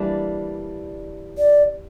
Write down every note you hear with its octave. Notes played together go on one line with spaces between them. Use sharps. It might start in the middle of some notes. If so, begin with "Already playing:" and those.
Already playing: E3 G3 A#3 D4
D5